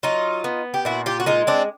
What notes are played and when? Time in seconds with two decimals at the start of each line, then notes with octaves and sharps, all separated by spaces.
0.03 F#3 D#4 F4
0.44 B3
0.74 G4
0.85 A#2 E4 F#4
1.06 F4 G4
1.20 F#4
1.26 G#3 D#4 F4
1.47 C4 D4